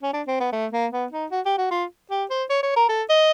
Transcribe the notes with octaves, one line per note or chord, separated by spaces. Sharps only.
C#4
D4
C4
B3
A3
A#3
B3
D#4
F#4
G4
F#4
F4
G4
C5
C#5
C#5
A#4
A4
D#5